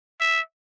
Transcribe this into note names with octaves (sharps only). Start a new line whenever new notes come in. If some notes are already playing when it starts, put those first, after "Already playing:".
E5